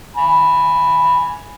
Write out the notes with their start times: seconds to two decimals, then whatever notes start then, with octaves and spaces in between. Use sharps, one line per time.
0.17 G#5 B5